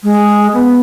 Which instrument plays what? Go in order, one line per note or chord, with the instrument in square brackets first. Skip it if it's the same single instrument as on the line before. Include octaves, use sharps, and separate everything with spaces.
[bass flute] G#3
B3